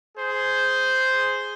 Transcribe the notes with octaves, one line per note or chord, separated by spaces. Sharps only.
G#4 C5